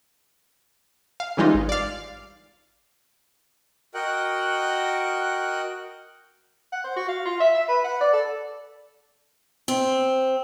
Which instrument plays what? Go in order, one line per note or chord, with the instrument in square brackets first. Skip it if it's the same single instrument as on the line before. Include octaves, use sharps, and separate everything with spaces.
[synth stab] F5
C#3 E3 G3 G#3 D#4 F4
G#1
D5 F5
[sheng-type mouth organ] F#4 A#4 D#5 F#5 G5 F#6
[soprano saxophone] F#5
C5
F#4
F5
F4
E5
E5
B4
F#5
D5
A4
[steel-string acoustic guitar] C4